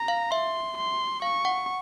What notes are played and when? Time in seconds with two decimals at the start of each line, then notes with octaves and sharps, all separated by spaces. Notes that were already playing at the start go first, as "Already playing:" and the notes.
Already playing: A#5
0.08 F5
0.31 E5 C6
0.77 C6
1.22 F5 C#6
1.45 F#5